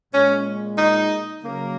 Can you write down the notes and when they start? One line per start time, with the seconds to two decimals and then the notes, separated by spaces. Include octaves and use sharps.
0.13 A#2 G#3 C#4
0.78 D#4
1.42 C#3 F#3 A#3